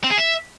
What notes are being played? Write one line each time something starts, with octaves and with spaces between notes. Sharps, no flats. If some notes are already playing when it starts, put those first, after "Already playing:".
C4
G#4
E5